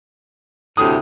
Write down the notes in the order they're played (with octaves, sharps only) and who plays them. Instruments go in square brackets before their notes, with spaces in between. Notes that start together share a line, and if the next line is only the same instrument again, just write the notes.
[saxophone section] D2 A2 C3 [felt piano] D#6